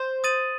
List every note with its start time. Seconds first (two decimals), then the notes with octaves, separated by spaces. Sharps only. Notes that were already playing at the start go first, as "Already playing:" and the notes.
Already playing: C5
0.24 D#6 A6 D#7 F#7